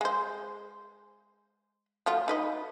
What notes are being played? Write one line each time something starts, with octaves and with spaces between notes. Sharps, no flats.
G#3 C5
F#3 A3 F4
D#4 B4 D#5